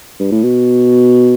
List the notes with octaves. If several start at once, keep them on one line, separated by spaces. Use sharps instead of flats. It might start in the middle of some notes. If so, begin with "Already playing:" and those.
G2
A2
B2